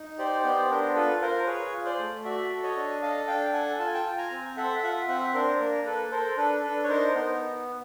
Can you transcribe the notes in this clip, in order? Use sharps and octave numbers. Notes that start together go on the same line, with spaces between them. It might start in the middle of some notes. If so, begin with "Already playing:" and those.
Already playing: D#4
G4 C5 D5
B3 C5 D5
D4 A#4 C5
F4 A4 B4
F4 A#4 C5
G#4 B4 C#5
F4
C5 D5
A3
F#4 D5 E5
A4
C#5 D#5
D4
A4 D#5 F5
D4 F5 G5
A4 F#5 G#5
F4 A5
G#5
G5 A5
F4
G#5 A#5
C4
A4 E5 F#5
F4 E5 F#5
C4 E5 F#5
D4 A#4 C5
A#3 A#4
A4 B4
A4 A#4 C5
D4 A4 B4
D4 A4 B4
C#5
D#4 A#4 C5
B3 A#4 C5